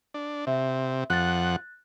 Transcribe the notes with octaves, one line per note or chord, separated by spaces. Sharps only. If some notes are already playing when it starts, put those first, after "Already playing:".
D4
C3 E5
F2 F#5 F#6 A6